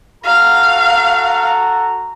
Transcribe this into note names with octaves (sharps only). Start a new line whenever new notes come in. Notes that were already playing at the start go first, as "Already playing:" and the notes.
F#4 A4 F5 A#5